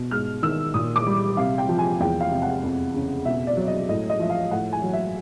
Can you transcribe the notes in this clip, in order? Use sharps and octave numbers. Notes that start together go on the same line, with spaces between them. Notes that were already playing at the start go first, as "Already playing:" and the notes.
Already playing: B2
G#2 F6
D#3 E6
A#2 D#6
D6
G3
C3 F5
G5
F3
G#5
E2 G5
F5
C3
F#5
F2
C#3
B2 E5
D5
F#3
D#5
A2 D#5
D#5
F3 E5
F5
A2 F#5
G#5
F#3
E5